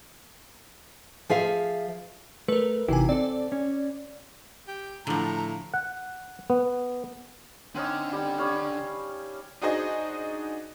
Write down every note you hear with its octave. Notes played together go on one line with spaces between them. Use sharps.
F3 G#4 E5 F5
A3 A#4 B4
G#1 C3 E3 E4 G4 G#5
C4 A4 D5
C#4
G4
A2 D3 F3 A#5
F#5
B3
D3 C4 C#4 D#4
G3
G3 C#5 F5
D4 D#4 F#4 G#4 C5 D#5